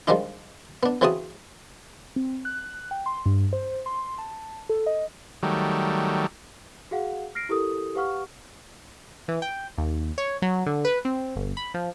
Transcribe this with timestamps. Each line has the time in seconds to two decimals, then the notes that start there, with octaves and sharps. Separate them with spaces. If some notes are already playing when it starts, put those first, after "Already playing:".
0.07 D#3 F3 G3 G#3 D4 D#4
0.83 B3 D4
1.01 C#3 E3 C4 F#4 A5 D#6
2.16 C4
2.45 F#6
2.91 G5
3.06 C6
3.26 G2
3.53 C5
3.86 C6
4.18 A5
4.69 A4
4.86 D#5
5.43 D#3 F#3 G3 A3
6.91 F#4 G#4 F5 F#5
7.35 F6 A#6 C7 D7
7.49 E4 G4 A4 A#4 D#6
7.95 G4 B4 F5 F#5 C#6 F6
9.28 E3
9.42 G5
9.78 D#2
10.18 C#5
10.42 F#3
10.66 D3
10.85 B4
11.05 C4
11.36 G1
11.57 B5
11.74 F3